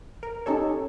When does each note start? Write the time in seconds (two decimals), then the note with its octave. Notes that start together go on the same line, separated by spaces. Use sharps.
0.23 A#4
0.46 C#4 D#4 G4 A4 C#5